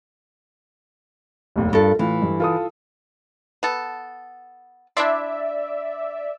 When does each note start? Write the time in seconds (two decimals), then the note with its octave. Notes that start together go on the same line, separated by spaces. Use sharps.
1.56 F1 D#2 A2
1.73 G2 F4 A4 A#4
1.99 A2 E3 F4
2.22 G2
2.40 F4 A4 D#6
3.63 B3 A4
4.97 D4 E4 D5 E5 C6